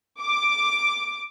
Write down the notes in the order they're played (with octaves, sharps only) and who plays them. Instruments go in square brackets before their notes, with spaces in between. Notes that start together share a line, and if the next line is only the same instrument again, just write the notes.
[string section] D6